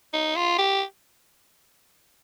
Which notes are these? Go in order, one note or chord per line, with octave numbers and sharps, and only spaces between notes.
D#4
F4
G4